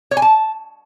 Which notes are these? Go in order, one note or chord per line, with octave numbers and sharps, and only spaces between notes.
C#5
G#5
A5